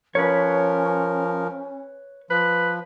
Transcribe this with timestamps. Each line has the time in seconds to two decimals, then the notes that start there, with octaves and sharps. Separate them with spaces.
0.15 F3 C#4 A#4 B4 C#5
2.30 F3 B4